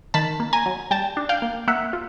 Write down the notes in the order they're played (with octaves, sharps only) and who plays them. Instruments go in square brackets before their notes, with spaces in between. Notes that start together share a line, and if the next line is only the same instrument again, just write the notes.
[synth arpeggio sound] D#3 A5 B5
A#3
G#5 A#5
F#3
G3 G5 A5
D4
F5 G5
A#3
A#3 E5 F#5
F4